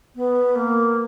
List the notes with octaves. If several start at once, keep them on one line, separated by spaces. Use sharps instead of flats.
B3
A#3